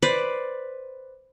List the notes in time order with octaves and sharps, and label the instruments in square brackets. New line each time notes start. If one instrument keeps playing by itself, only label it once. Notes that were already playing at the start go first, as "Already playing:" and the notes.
[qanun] B4 C5 D5